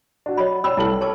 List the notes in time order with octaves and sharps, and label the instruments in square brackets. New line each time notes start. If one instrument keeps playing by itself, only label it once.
[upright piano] D4 F#4
[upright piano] F#3 [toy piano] C#5 D#5 B5
[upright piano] D5 E6 [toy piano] G5 B5
[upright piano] C2 A5 F#7 [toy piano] E4 A4 B4
[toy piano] A#4 A5 D6 [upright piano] C#5